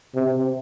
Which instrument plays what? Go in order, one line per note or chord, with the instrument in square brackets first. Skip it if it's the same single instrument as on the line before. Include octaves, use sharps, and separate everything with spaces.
[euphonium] C3